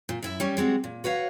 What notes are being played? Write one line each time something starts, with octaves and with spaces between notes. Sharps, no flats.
A#2
F#2 E4 E5
G3 C#4
G3 G#3 C4 F#4
A#2
F#4 B4 C#5 F5